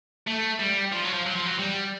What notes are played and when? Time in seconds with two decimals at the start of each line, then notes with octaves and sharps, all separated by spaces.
0.27 A3
0.59 G3
0.92 F3
1.04 F#3
1.14 F3
1.26 F#3
1.36 F3
1.46 F#3
1.59 G3